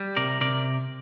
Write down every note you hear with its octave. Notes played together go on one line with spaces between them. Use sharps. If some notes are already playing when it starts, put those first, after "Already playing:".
Already playing: G3
C3 A#4 D5
C3 A#4 D5